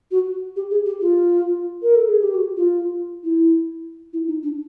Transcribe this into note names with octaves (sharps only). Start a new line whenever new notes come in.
F#4
G4
G#4
G4
F4
A#4
A4
G#4
G4
F#4
F4
E4
E4
D#4
D4